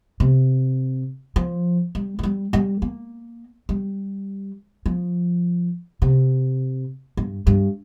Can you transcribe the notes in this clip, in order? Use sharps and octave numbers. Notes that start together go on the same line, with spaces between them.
C3
F3
G3
F3
G3
G3
A#3
G3
F3
C3
G2
G2